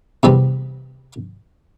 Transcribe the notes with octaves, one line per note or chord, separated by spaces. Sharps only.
E2 C3 E3 G3 C4